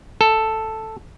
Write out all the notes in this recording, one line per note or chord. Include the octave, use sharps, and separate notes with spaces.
A4